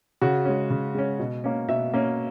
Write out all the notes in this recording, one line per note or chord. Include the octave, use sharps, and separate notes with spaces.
C#3 F#4
G#3 C#4
C#3
G#3 C#4
B2
A#3 C#4
B2 E5
A#3 C#4